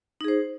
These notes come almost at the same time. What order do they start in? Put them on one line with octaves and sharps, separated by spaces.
D#4 G#4 C5